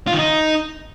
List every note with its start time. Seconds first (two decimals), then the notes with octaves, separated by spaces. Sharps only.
0.07 F4
0.13 D#3
0.19 D#4